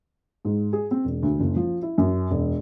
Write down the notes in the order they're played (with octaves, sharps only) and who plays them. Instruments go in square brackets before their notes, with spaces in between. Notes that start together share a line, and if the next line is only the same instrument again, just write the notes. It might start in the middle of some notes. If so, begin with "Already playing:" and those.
[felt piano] G#2
G#4
C4
E1
D2
F#1
F3
E4
F#2
E1